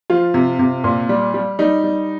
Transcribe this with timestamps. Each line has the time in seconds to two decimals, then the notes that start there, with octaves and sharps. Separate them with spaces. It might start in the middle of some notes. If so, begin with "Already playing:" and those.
0.10 F3 F4
0.34 C3
0.59 C3
0.84 A#2
1.09 G3
1.34 G3
1.59 G3 D#4
1.84 G3